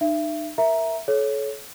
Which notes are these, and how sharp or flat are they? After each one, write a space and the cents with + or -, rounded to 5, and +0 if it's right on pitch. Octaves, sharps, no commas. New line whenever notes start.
D#4 -40 E5 +30
A#4 -5 E5 +0 A#5 +0
A4 -40 C#5 +0